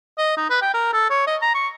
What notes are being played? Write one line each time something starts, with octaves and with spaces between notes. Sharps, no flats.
D#5
D#4
B4
G5
A#4
A4
C#5
D#5
A#5
C#6